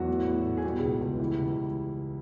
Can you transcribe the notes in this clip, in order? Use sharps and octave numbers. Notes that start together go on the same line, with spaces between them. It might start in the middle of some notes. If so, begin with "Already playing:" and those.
Already playing: E2 F#3 F#4
A2
A2
A2
G#4
B2 G3 G4
C#2
C#2
E3
C#2